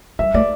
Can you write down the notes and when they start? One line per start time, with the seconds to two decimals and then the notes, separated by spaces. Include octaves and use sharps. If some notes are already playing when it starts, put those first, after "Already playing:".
0.19 G3 E5
0.34 A3 D5